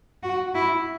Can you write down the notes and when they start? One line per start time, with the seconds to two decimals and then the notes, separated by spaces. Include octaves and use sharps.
0.23 F#4
0.55 E4